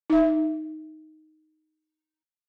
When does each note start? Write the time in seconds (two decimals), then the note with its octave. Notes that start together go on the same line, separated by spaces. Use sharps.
0.10 D#4 E5